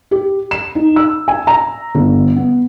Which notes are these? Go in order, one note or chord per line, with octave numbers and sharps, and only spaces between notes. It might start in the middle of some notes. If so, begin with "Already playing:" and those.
G4
E7
D#4
E6
G#5
A#5
G1
B3